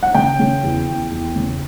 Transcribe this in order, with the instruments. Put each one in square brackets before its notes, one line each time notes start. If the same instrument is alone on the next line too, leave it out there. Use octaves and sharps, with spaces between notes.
[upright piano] F#5
C#3 G5
C#3
E2
E2
E2
C#3